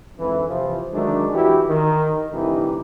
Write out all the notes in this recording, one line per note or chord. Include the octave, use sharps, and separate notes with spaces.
F2 G#2 D3 E3
C3 E3 F3
D#3 F#3 G#3 A3 D4
E3 E4 F#4 G4
D#3
C2 A2 D3 E3 D#4 G4